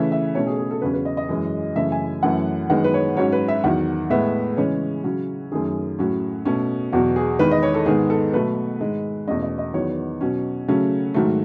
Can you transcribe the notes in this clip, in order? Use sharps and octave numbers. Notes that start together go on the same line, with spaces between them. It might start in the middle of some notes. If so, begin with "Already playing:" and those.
Already playing: C#3 E3 A3 C#4 E5
E5
B2 A3 C#4 C#5
G#4
G#4
A4
E2 C#3 F#3 C#4 B4
B4
D#5
D#5
F#2 E3 G#3 C#4
F#2 C#3 E3 A3 C#4 E5
G#5
F#2 E3 A3 C#4 F#5
F#2 D#3 G#3 B3 F#5
B4
C#5
G#2 F#3 C#4 C#5
B4
E5
E2 D#3 F#3 F#5
A2 G#3 B3 E5
C#3 E3 G#3 C#4 C#5
C#3 F#3 C#4
F#2 D#3 A3 C#4 G#4
A2 F#3 C#4
B2 A3 C#4
E2 B2 F#3 F#4
G#4
E2 D#3 G#3 B4
D#5
C#5
A4
G#2 D#3 G#3 B3 G#4
A4
B2 F#3 A3 B4
G#2 D#3 G#3
E2 B2 A3 C#4 D#5
D#5
D#5
E2 D#3 F#3 B3 C#5
B2 F#3 C#4
C#3 F#3 A3 C#4
G#2 D#3 F#3 A3